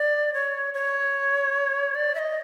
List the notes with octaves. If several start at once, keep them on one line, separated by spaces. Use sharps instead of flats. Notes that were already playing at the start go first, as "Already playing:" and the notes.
Already playing: D5
C#5
C#5
D5
E5
D#5